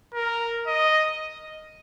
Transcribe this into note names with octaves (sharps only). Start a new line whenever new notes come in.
A#4
D#5